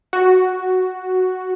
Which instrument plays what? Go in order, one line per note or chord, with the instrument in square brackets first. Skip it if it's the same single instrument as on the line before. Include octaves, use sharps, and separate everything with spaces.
[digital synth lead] F#4